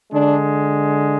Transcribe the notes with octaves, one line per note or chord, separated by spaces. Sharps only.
D3 G#3 D4